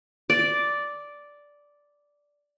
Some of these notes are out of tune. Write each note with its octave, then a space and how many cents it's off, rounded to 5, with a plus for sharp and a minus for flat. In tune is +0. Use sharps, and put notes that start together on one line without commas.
D5 -5